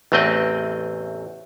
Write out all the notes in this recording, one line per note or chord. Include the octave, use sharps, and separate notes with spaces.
A1 E2 A3 C4 D#5 G5